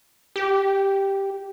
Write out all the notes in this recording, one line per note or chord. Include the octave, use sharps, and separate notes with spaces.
G4